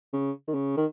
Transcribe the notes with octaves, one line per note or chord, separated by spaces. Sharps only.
C#3
D#3
C#3
D#3